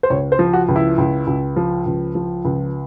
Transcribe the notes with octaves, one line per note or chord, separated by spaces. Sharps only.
C5
C#2 C#5
C5
F3
F#4
C#2
E4
C#2
C#2
F3
C#2
F3
C#2